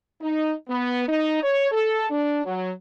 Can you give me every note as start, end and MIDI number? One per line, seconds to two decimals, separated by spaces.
0.22 0.52 63
0.69 1.07 59
1.08 1.42 63
1.43 1.72 73
1.72 2.09 69
2.10 2.45 62
2.45 2.71 54